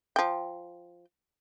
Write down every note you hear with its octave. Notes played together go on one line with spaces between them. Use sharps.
F3 G5